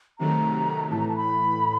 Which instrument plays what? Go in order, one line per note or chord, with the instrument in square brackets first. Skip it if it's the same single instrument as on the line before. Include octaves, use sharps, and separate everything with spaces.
[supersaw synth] C3 D#3 F#3 A3 [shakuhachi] A#5
[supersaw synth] A2 E3 A3 [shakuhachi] A5
[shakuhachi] A#5
A5
B5